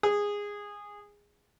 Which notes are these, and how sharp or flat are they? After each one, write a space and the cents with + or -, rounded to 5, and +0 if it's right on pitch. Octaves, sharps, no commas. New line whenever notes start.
G#4 -15